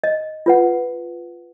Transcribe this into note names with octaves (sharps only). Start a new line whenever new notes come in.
D#5
F4 B4 F#5